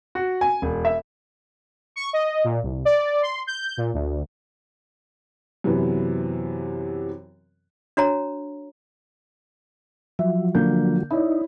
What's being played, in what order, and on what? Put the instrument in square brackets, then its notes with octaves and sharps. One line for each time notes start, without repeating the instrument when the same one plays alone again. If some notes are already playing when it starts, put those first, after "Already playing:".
[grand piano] F#4
G#5
E1
E5
[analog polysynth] C#6
D#5
A#2
C2
D5
C6
G6
A#2
D2
[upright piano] F#2 C3 E3 B3
[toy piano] D4 F#4 C#5 A#5
[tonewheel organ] F3 F#3 [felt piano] E5
[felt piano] D3 A#3 G6
[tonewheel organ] D#4 [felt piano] E4 C#5 D5